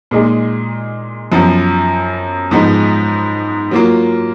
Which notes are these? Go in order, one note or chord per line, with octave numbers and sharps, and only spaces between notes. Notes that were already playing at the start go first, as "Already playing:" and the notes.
A#2 G#3 D#4 G#4
F#2 F3 B3
G#2 F3 G#3 B3 D#4
F#3 A#3 F4